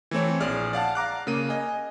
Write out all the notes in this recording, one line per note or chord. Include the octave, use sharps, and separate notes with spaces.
E3 A3 C4 C#5
A#1 G#4 D5 F6
D5 F5 F#5 A5
F5 A#5 D6 F#6
C#3 A#3 D#7
D#5 G#5